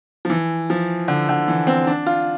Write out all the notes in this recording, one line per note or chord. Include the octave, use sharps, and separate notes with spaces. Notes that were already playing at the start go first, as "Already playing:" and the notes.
F3
E3
F3
D3
D3
E3
C4
D4
F4